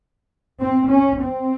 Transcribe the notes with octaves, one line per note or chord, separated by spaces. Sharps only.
C4
C#4
C4